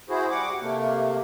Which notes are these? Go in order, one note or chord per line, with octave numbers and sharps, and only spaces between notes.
E4 F#4 G#4 C5
G3 F#5 D6
C3 A3 A#3